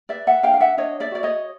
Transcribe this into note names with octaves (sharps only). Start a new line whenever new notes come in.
B4 D5 E5
E5 F#5
D4 F5 G5
F5
E5 F#5
D4 C#5 D#5
D5 E5
F#4 D5
C#5 D#5